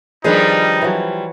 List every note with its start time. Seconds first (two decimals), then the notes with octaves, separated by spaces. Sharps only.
0.24 D#3 F3 G3 D4 D#4 G#4 B4
0.82 E3 F#3